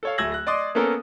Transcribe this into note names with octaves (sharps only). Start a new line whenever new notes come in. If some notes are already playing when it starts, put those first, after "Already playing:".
A4 C#5 F5
D1 A3 E6 G#6 A#6 F#7
F#6 A#6
D5 D#5 C6 D6 D#6
A#3 B3 C#4 A4 A#4 G#5